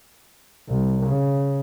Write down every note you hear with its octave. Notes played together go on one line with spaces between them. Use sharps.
C2
C#3